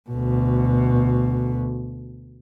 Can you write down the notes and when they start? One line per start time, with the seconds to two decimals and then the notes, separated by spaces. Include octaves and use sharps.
0.10 D2 B2